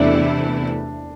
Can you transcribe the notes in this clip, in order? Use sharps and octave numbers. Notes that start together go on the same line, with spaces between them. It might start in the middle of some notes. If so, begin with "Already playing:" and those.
Already playing: E2 C3 E3 A3 D4 E4